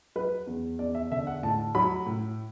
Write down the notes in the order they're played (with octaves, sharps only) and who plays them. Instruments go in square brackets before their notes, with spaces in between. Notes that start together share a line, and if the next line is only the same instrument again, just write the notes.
[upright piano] F#3 B4
E2
E2 D5
E5
D3 E5
F#5
A2 A5
F#3 B5
A2